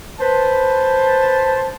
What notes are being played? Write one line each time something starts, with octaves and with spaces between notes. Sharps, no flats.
B4 C5 A5